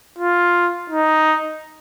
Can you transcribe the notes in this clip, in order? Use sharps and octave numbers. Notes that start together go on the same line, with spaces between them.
F4
D#4